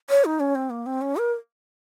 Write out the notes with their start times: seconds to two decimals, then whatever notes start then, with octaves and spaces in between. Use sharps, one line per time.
0.10 C#5
0.25 D#4
0.40 C#4
0.55 C4
0.70 A#3
0.86 C4
1.01 C#4
1.17 A#4